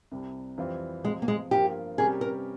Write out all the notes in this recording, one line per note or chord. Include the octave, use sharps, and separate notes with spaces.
C2 C3 G3
F2 E3 G3 C4 F4
C3 F3 G#3 C4
A#3
G#3
G2 F3 A#3 F4 G4 A#4
C3 G3 C#4 G4 G#4 A#4
A#4